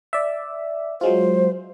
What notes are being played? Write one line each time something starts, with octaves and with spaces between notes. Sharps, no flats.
D5 E5
F#3 G#3 F4 C5